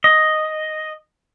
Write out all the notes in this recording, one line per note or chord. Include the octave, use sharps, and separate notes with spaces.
D#5